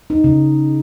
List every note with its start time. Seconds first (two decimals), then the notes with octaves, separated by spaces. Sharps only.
0.10 D#4
0.24 C#3